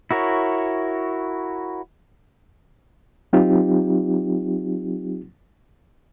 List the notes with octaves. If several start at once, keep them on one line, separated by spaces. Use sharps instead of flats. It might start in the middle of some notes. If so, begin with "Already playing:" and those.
E4 F#4 A#4 C#5
F#3 C4 D#4 F4 G4